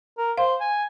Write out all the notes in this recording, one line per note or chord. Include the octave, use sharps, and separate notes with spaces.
A#4
C5 F5
G#5